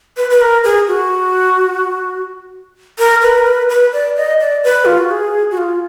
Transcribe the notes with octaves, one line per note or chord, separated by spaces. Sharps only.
B4
B4
A#4
G#4
F#4
A#4
B4
A#4
B4
B4
D5
D#5
D5
B4
F4
F#4
G#4
F#4
F4